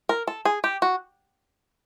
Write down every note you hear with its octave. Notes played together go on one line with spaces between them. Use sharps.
A#4
A4
G#4
G4
F#4